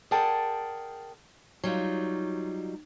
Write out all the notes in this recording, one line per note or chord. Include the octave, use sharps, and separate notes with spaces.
G#4 A#4 D5 F#5 G5 A5
F#3 G3 D#4 F4